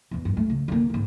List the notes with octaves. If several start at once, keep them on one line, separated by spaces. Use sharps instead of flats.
E1 E2
G2
A3
C#3
D3 A#3
G#2 D3